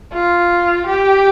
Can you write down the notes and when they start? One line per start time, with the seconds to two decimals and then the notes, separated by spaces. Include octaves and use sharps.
0.13 F4
0.87 G4